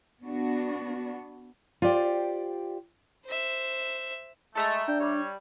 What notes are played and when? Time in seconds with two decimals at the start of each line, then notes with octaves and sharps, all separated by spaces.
0.24 B3 D4 F#4
1.82 F4 G4 C5 D5 G5
3.26 C5 E5
4.55 G#3 A3 A4 E5 A5 A#5
4.88 D4 G5
5.00 G3 C#5